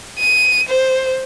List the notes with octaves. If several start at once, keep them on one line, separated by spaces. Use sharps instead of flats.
D#7
C5